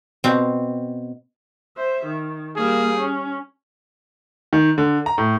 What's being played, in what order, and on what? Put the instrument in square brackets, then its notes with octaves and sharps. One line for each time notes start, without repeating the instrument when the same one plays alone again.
[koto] B2 C4
[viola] C5 E5
D#3
[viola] G3 A#3 [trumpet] G#4
[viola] C#4
[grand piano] D#3
D3
A#5
A2